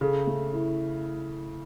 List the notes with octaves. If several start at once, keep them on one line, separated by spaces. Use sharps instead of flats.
C#3 A4
A3
E4